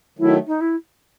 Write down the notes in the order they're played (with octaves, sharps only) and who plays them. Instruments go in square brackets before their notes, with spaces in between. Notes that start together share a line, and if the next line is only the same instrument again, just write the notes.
[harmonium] D#3 F#3 A3 [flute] E4
[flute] D#4
E4